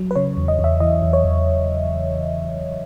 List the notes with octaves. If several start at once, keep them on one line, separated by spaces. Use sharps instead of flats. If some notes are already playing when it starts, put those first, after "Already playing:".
Already playing: F#3
B4
C#3 C#5
E2
D#5
E2
E5
E3 D#5
E2
C#5
E2